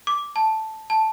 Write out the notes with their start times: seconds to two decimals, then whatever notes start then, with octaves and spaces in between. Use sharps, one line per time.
0.07 D6
0.36 A5
0.90 A5